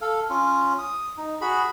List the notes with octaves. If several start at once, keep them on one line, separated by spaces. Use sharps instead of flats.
A4 F5
C#4 F4
D#6
D#4
F#4 G#4 B5